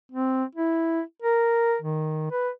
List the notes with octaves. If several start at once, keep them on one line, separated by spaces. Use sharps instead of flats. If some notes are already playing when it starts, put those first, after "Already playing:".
C4
E4
A#4
D#3
B4